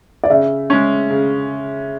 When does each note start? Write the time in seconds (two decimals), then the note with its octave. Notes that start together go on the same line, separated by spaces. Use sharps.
0.23 D5
0.30 C#3 E5
0.70 G#3 C#4
1.11 C#3